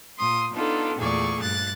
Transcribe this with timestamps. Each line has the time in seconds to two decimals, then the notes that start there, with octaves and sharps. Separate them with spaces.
0.18 A#2 C6 D#6
0.53 B3 D4 D#4 F4 A4
0.98 E2 A#2 A3 G#4 D5 C#6
1.41 G2 F#6 A6